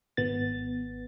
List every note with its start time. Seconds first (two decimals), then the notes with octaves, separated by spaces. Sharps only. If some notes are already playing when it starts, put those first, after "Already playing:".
0.17 G#1 B3 A6